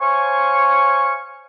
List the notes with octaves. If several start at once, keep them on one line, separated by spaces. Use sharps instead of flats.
C5 C#5 F5 G#5 C#6